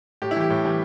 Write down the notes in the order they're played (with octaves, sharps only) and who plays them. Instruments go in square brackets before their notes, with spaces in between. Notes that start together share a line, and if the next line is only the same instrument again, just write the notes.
[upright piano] A2 G4
E4
E3 G3 G4
A2
E3 G3